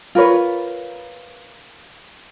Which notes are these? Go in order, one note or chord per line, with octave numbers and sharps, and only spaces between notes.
F4 A#4 B4 C#5